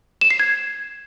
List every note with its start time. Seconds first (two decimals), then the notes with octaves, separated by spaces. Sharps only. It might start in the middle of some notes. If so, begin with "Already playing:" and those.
0.21 E7
0.30 C7
0.40 G#6